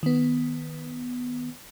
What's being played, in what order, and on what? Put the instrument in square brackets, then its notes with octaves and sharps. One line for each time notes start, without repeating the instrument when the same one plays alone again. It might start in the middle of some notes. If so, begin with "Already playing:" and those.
[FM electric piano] D#3 B3